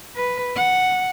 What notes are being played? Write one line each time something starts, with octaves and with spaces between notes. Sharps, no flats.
B4
F#5